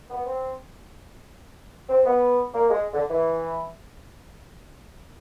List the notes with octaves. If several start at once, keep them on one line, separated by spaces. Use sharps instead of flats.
B3
C4
C4
B3
A#3
G#3
D3
E3